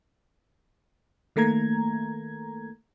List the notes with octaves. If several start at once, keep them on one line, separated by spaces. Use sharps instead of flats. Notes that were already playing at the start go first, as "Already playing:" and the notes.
D#3 A3 A#3 A#5 G#6